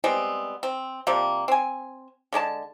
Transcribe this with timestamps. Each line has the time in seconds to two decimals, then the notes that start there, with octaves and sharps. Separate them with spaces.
0.04 G3 G#3 B3 C4
0.63 C4
1.07 C3 F3 G3 A#3
1.48 C4 G#5
2.33 D3 G#3 D5 A5